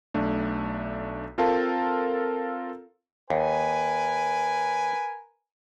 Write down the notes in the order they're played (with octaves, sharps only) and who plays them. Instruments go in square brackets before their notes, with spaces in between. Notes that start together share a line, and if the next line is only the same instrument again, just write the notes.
[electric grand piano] B1 A3 D4
C4 F4 A4 A#4 F5 A5
[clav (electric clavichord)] D#2 [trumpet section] A#4 B4 G#5